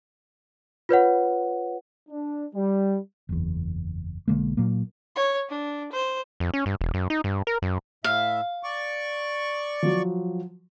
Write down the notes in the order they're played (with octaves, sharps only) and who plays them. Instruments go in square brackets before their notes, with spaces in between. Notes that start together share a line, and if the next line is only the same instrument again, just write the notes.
[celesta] F4 B4 C#5 F#5
[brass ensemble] D4
G3
[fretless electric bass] F#1 E2
B1 D3 G#3 A#3
A#2 F#3 A#3
[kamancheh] C#5
D4
C5
[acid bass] F2
C#4
G2
E1
F#2
D#4
G2
A#4
F#2
[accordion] A2 E5 [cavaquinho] F5
[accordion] D5 C#6
[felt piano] F3 F#3